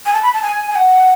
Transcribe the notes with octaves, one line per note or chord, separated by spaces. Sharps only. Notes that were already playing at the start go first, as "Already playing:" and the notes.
G#5
A5
B5
A5
G#5
G#5
F#5